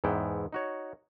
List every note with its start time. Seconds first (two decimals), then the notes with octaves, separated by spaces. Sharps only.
0.04 E2 G#2 B3 E4 G5
0.53 D#4 F#4 C#5